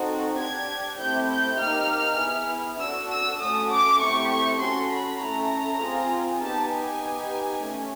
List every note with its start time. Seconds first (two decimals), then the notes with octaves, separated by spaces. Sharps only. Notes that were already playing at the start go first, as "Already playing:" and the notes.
Already playing: C4 D#4 F#4 A4
0.38 D4 G4 G#6
0.99 A3 C4 E4 G4 G6
1.29 G6
1.59 A#3 D#4 G4 F6
2.19 B3 E4 G#4
2.79 D4 F#4 A4 E6
3.10 E6
3.40 A3 C#4 F#4 A4 D#6
3.70 D6
4.00 A3 C4 E4 G4 C#6
4.31 C#6
4.60 C#4 F#4 A4 C6
4.90 B5
5.21 A3 C#4 E4 A4 A#5
5.81 C4 F4 G#4
6.42 B3 D#4 G4 A5
6.71 G#5
7.02 B3 D#4 G4
7.62 A3 C#4